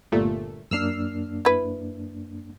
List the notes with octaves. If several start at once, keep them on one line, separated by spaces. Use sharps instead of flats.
G1 A#2 A3
F#2 A#3 D4 E6 F6 C7
E4 B4